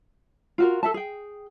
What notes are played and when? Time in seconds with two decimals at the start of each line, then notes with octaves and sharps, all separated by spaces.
0.58 F4 F#4 A#4
0.83 A4 E5 A5
0.94 G#4 G5